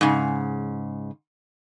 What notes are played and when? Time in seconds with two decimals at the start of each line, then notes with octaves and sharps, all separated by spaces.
0.01 G#2 C#3